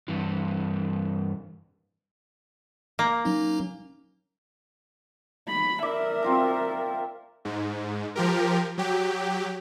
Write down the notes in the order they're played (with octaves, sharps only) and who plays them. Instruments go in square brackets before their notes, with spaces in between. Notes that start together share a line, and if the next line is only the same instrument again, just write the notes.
[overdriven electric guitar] G2 E3
[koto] A#3
[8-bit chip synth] F#3 C#4 D#4
[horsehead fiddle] B5
[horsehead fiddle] A#4 E5 [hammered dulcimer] D5
[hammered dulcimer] C4 F4 A#5
[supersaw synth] G#2
F3 G4 A#4
F#3 G4